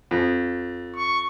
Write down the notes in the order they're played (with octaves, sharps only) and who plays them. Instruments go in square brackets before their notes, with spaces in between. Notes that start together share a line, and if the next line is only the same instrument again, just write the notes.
[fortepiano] F2
[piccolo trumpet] C#6